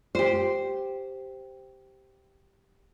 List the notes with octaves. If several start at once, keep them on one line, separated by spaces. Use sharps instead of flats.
G4 C5